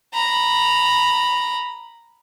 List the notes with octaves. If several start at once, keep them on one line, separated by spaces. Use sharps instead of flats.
A#5 B5